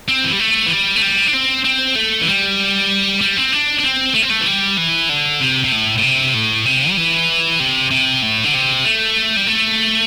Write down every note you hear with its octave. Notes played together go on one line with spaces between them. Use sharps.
C4
E3
G3
A3
E3
G3
A3
G3
D4
C4
C4
A3
E3
G3
G3
C4
D4
D4
C4
A3
C4
A3
E3
G3
E3
D3
C3
C3
A2
A2
C3
A2
C3
G3
E3
C3
C3
A2
D3
C3
A3
G3
A3